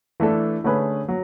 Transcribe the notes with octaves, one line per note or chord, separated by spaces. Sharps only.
E3 A3 D4 A4
D3 A3 C#4 G#4 B4
F#3